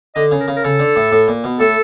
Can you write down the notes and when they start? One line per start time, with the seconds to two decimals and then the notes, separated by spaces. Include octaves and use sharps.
0.16 D3 D#5
0.31 C#3
0.40 A#4
0.48 C#3
0.56 A#4
0.64 C#3 A4
0.80 D3
0.96 A2
1.12 A2
1.28 A#2
1.44 B2
1.60 A2 A4